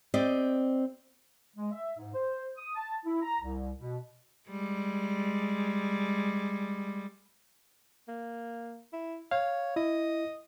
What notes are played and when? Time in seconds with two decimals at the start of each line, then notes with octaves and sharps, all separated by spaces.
0.14 C4 G4 D5 D#5
1.57 G#3
1.72 E5
1.97 G#2
2.14 C5
2.57 D#6
2.76 A5
3.05 E4
3.22 A#5
3.41 C2
3.78 B2
4.49 G3 G#3
8.08 A#3
8.93 E4
9.31 C#5 F5
9.76 E4 D#5